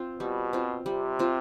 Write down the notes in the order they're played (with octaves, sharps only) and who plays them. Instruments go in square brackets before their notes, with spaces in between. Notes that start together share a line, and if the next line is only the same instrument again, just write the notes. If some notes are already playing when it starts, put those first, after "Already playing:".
Already playing: [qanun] C4 F4
[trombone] B2 [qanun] G3
[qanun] C4 F4
[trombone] C3 [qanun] G3
[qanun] C4 F4